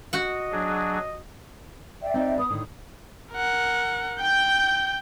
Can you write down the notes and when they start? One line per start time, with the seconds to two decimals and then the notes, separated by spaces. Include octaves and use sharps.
0.13 F#4 D#5 F#5
0.52 F#3 D4 G#4
2.02 D5 E5 G5
2.14 C4 D#4
2.38 B3 B4 D#6
2.50 A2 D3 D#3
3.33 A#4 F#5
4.20 G5 G6